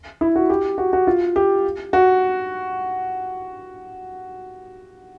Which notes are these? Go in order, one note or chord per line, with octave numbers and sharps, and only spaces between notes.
E4
F#4
G4
F#4
F#4
F4
G4
F#4